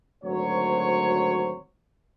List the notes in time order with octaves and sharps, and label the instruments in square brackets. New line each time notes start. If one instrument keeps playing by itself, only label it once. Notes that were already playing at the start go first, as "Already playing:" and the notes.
[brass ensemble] G#1 D2 F#3 C5 C#5